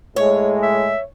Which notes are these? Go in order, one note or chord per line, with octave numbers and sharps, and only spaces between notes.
A2 G#3 C#5
E5